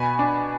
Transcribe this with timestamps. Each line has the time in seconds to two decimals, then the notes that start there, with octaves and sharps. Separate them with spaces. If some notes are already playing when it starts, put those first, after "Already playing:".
Already playing: B2 G#5 B5
0.19 D4